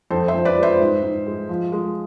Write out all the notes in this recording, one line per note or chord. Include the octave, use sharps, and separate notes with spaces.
F2 A4 C5
C5 E5
F2
B4 D5
G#3
C5 E5
G#2
G#2
G#3
F3
G#3